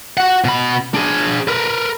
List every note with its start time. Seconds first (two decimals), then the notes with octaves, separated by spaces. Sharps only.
0.17 F#4 F#5
0.44 B2 B5
0.94 D4 G#4
1.48 A#4 B4